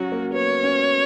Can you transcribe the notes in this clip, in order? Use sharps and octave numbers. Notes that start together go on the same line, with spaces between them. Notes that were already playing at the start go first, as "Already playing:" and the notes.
Already playing: F#3 C#4 F#4
A#3
B3 C#5
C#4